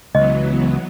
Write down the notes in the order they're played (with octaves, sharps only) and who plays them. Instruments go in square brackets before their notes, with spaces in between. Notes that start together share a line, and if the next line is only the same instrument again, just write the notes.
[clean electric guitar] C#2 [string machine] E3 F#3 B3 [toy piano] D#5